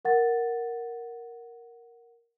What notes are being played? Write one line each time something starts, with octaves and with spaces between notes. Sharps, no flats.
A#4 F#5 A6